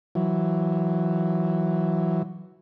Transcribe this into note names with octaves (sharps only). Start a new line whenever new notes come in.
E3 F#3